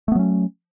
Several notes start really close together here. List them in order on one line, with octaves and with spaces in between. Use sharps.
A3 B3 F#3 C#4